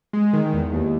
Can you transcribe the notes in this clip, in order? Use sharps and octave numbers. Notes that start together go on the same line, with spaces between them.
G#3
D#3
E2
D#2